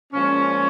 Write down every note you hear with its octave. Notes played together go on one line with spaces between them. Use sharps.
A#2 F3 G#3 C#4